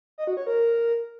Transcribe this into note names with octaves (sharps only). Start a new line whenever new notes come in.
D#5
F#4
C#5
A#4